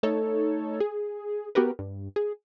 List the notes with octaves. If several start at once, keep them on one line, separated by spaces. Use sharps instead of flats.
A3 D#4 A4 C#5
G#4
B3 F#4 G4 A#4 B4
G2
G#4